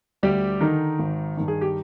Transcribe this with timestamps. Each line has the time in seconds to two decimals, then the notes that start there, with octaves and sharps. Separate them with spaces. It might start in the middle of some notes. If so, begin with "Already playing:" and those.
0.23 D2 G3 G4
0.61 D3 D#3 D#4
0.99 G#1
1.37 G2 D#3
1.48 G#4
1.61 G4